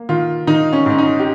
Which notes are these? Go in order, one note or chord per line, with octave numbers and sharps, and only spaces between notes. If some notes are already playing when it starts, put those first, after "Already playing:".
Already playing: A#3
D#3 F4
D#3 D#4
C#4
G#2 C#4
D#4
G4